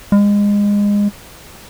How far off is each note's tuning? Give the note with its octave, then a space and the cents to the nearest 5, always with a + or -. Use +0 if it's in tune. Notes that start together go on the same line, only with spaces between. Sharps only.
G#3 -25